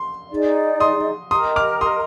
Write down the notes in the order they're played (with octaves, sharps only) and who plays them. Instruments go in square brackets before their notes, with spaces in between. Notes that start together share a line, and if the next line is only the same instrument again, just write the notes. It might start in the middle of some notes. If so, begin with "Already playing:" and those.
Already playing: [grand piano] C6
[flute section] D#4 G#4 D5
[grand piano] C6 D#6
[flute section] G4 A#4 D#5 A#5 [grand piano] C6 D#6
[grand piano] D6 F6
C6 D#6